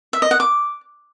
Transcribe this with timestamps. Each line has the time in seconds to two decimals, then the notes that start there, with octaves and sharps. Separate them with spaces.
0.13 E5
0.22 D#5
0.31 F#5
0.40 D6